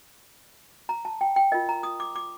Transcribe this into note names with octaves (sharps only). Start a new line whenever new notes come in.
A#5
A5
G5
G5
F4 A#4 D#5
A#5
D#6
D6
D6